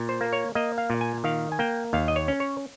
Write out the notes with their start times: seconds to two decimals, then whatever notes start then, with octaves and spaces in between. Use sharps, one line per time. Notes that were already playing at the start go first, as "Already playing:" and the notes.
Already playing: A#2
0.09 C5
0.21 A#3
0.33 C#5
0.55 A#3 D#5
0.78 F5
0.90 A#2
1.01 G#5
1.24 D#3 F5
1.52 G#5
1.59 A#3 G5
1.93 D#2 F5
2.08 D#5
2.16 C#5
2.28 C#4
2.40 C#5